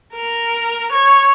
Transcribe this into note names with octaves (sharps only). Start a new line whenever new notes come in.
A#4
C#5